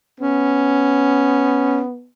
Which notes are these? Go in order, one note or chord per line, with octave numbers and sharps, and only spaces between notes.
B3 C#4